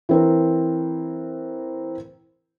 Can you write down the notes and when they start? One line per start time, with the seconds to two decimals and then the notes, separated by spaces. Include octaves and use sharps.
0.09 E3 C4 A#4